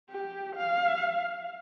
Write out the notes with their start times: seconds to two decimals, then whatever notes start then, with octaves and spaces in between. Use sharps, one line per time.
0.10 G4
0.56 F5